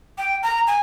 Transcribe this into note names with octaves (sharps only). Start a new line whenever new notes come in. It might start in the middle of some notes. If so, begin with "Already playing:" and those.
G5
A#5
G#5